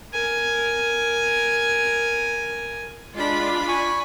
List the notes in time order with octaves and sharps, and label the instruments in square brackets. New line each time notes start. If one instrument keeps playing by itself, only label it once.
[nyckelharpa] A#4 G#5
[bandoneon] G#3 [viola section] D4 F4 [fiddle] D5 B5
[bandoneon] G#5 C#6